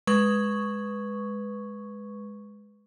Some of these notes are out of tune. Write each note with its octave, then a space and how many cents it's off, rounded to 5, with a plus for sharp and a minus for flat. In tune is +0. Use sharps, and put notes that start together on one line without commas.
G#3 +0 B4 +0 C#6 +0